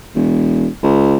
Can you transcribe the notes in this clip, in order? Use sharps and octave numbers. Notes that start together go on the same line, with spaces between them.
E1
C#2